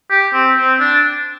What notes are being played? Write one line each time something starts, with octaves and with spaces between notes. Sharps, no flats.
G4
C4
C4
D4